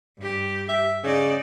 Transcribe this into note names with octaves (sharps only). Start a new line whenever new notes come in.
G2 G4
E5
C#3 D#4 D5